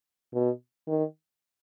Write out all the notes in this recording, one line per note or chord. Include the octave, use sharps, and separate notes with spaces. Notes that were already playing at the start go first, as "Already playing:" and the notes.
B2
D#3